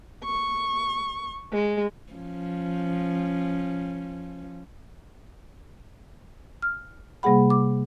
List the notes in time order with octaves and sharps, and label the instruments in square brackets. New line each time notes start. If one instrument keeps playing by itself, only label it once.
[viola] C#6
G#3
[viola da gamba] F3 C#4
[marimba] F6
C3 G3 A#3 G#4 F#5 B5
D6